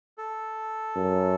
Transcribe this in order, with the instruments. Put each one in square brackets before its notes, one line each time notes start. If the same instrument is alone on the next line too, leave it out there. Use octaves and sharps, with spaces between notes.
[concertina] A4
[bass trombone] F#2